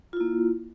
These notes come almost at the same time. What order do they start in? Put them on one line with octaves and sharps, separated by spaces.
F4 E4 A#3